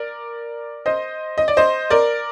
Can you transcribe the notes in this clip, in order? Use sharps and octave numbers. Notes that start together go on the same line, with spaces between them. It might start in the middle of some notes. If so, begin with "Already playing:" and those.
Already playing: A#4 D5
C5 D#5
D#5
D5
C5 D#5
A#4 D5